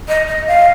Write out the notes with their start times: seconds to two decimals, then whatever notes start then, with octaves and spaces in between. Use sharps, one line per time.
0.08 D#5
0.28 D#5
0.48 F5